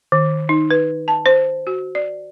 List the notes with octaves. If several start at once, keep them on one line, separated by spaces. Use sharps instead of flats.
D#3
D#4
B4
A5
C5
F#4
D5